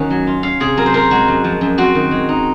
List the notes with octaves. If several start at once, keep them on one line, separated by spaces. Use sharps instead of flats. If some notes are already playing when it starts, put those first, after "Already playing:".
Already playing: F#2 D#3 A#3 C#4 D#5 F#5
F#3
F4
C#4 F5
C3 G#4
F#3 A#4
C5
F4 A#4
G#3 F#4
F#2
F3
F#2
C4 F#4
D#3
G#3
D#4